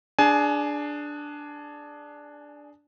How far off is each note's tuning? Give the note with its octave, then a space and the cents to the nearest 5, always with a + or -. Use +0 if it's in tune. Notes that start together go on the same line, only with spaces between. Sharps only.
D4 +0 G#4 +0 G#5 +25